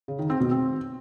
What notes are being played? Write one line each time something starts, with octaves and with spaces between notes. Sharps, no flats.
C#3
D#3
C4
B2
C4